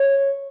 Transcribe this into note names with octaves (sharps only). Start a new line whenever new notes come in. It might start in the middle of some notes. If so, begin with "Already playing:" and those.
Already playing: C#5